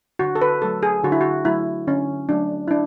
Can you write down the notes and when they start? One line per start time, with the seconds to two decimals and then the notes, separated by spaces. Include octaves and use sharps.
0.19 D3 F#4
0.35 A4
0.42 B4
0.62 F#3 A3 A4
0.83 G#4
1.03 D3 F#4
1.12 E4
1.21 F#4
1.45 F#3 A3 E4
1.87 D3 C#4
2.29 F#3 A3 D4
2.68 E4
2.71 D4